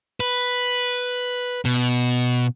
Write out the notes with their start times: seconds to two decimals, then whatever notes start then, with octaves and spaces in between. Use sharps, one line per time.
0.20 B4
1.65 B2